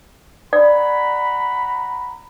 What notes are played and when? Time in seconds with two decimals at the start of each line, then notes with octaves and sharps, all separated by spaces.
0.53 D5 F#5 A#5 B5